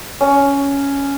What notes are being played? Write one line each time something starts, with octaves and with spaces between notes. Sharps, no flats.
C#4